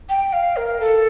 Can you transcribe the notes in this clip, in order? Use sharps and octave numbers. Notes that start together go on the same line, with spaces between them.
G5
F5
A#4
A4